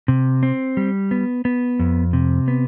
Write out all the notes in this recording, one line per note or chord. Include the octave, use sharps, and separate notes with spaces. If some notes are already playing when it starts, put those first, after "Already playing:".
C3
C4
G3
B3
B3
F2
C3
B3